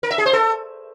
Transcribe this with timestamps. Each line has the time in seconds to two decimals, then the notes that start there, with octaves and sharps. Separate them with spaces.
0.03 A#4
0.11 E5
0.18 G#4
0.26 C5
0.33 A4